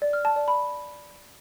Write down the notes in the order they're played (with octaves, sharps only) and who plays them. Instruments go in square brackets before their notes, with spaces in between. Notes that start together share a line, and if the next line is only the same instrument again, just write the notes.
[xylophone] D5
F6
A5
D5
B5